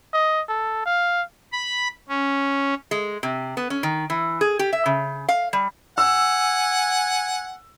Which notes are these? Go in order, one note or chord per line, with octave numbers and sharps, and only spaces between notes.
D#5
A4
F5
B5
C#4
G#3
C3
B3
C#4
D#3
E3
G#4
G4
E5
C#3
F5
G3
F#5 G#5 E6